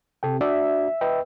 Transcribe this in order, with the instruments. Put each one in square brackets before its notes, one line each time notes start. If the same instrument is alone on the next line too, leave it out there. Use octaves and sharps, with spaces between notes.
[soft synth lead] C3 [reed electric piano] A4 G5
[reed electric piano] D4 F#4 D5 [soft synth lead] E5
[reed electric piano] B4 D#5 G5